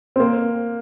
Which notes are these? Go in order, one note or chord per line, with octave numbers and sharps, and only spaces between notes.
C4
A#3